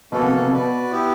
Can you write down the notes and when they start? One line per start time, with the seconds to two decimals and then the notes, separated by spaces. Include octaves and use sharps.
0.12 B2 A#3 C#4 F#4 A4
0.22 C3
0.32 B2
0.42 C3
0.51 B2 F#4 B4 D5
0.91 B3 E4 G4